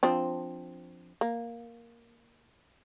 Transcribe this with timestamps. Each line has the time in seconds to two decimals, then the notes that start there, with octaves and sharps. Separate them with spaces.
0.03 F3 C4 D4
1.21 A#3